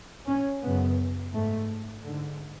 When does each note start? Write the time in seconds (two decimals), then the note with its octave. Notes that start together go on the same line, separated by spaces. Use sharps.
0.27 C#4
0.62 F#2 C#3 B3
1.33 G#2 A3
2.05 G#2 D3